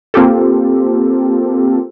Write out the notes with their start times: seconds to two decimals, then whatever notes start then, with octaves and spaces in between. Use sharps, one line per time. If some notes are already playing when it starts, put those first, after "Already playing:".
0.14 A#3 C4 F4 G4 A4